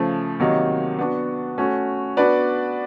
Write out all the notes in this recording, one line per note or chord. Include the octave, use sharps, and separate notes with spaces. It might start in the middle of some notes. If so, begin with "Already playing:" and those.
Already playing: C#3 F3 A3
C3 D#3 F#3 A#3 D#4
B3 D4 F#4
A3 C#4 F#4
B3 D4 F#4 B4 D5